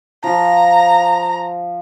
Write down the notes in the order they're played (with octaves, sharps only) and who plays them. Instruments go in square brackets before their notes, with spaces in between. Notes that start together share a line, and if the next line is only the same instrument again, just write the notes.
[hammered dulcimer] F3 [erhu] A#5